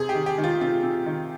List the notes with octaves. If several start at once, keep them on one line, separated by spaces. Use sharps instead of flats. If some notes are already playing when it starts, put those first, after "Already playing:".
Already playing: C3 G#4
G4
D#3
G4
D#3
F4
C3 F4
C3
D#3